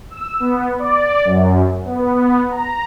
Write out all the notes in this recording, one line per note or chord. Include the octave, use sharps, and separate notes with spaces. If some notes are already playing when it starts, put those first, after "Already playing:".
E6
B3
D5
F#2
B3
B3
A#5